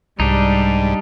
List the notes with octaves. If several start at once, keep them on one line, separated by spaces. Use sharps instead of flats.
C2 G#2 G3 D4 D#4